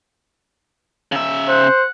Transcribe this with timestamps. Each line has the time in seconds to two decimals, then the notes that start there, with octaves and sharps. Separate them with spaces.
1.12 C#3 E5
1.48 C5 F#5